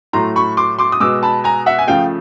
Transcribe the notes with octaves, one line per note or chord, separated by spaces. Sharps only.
A2 F#3 A3 A#5 C6
B5 C#6
C6 D6
C6 D6
D#6
B2 G#3 D6 E6
A5 B5
G#5 A#5
E5 F#5
G#5
C#3 F3 A3 F5 G5